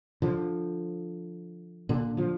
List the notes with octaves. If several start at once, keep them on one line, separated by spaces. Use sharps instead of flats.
D3 F3
A#2 D3
D3 F3